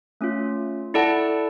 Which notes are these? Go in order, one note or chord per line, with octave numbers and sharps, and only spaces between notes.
A3 C#4 F4
E4 A4 D5 F#5 A5